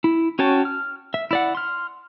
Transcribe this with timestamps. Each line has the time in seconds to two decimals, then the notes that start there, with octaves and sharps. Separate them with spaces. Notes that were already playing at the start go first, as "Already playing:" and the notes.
0.04 E4
0.39 C#4 F#4 C#5 G5 A5
0.65 F6
1.14 E5
1.31 E4 D5 F#5
1.55 C6 F6